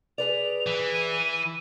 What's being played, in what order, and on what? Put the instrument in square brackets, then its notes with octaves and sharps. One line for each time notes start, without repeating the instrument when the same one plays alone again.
[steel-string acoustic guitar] G#4 B4 D5 [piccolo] F7
[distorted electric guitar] E3
[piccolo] D#7